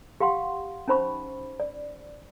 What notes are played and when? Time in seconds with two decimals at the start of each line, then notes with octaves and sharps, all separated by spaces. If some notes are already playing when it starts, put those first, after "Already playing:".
0.20 G4 F5 F#5 C6
0.88 C#4 D#4 C5 B5 C#6
1.60 D5